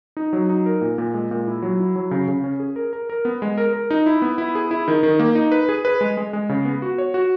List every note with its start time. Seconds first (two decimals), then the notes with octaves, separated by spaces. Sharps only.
0.17 D#4
0.33 F#3
0.49 D#4
0.66 A#4
0.81 A#2
0.98 A#2
1.14 G#3
1.31 A#2
1.47 E4
1.62 F#3
1.79 E4
1.96 F#3
2.11 C#3
2.28 C#3
2.44 C#4
2.60 G#4
2.76 A#4
2.93 A#4
3.10 A#4
3.25 B3
3.42 G#3
3.58 A#4
3.73 A#4
3.90 D#4
4.06 E4
4.22 B3
4.38 E4
4.55 G#4
4.71 E4
4.88 D#3
5.03 D#3
5.20 A#3
5.35 D#4
5.52 B4
5.69 G#4
5.85 B4
6.01 G#3
6.17 G#3
6.33 G#3
6.49 C#3
6.65 B3
6.82 F#4
6.98 C#5
7.14 F#4